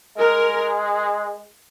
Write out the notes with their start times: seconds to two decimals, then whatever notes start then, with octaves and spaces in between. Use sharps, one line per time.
0.18 G#3 A#4